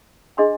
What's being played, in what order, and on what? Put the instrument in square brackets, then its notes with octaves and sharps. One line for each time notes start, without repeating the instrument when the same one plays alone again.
[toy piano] D4 G#4 D#5 G#5 C6